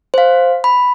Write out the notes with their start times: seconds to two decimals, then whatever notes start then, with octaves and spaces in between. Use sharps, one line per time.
0.14 C5 F5
0.64 B5